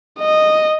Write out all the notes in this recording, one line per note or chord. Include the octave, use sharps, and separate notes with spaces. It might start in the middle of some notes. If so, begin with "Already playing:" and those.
D#5